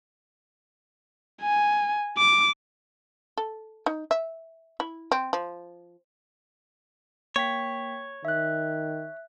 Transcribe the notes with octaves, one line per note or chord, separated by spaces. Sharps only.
G#5
D6
A4
D#4
E5
E4
C4
F3
A#3 C#5 G5 B6
D#3 E5 F#6